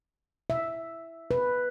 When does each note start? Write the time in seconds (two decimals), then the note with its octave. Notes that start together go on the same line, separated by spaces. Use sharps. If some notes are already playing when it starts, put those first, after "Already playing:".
0.50 E5
1.31 B4